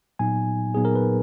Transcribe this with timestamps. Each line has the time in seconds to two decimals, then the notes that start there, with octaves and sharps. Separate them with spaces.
0.19 A#2 F#3 B3 D#4 G#5
0.74 A#2 F#3 B3 D#4 G#4
0.85 A#4
0.95 B4